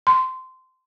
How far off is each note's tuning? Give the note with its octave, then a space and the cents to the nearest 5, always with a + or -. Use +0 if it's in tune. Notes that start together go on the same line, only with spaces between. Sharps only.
C6 -15